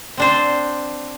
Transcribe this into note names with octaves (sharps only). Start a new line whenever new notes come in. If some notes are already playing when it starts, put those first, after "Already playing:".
C4 D4 C5